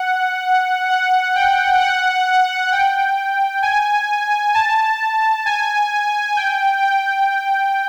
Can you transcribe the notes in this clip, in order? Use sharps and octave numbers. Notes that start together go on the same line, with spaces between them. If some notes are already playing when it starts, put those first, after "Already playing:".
Already playing: F#5
F#5
G5
F#5
G5
G#5
A5
G#5
G5
G5